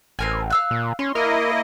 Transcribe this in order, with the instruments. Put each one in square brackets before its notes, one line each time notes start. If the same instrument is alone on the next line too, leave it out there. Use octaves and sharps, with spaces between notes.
[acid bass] A1 [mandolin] C4 A#4 G#5
[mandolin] F5 E6 F#6
[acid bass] A#2
[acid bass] C#4 [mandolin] C6
[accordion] A#3 E4 D#5 [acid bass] A#4 [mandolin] C6 F6